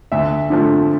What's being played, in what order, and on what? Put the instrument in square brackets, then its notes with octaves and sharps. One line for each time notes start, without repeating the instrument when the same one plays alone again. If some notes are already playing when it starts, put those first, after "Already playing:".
[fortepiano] D2 E5
D3 F3 A3